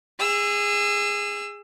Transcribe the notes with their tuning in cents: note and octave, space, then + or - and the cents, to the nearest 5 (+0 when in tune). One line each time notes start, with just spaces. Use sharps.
G#4 -15 E6 +20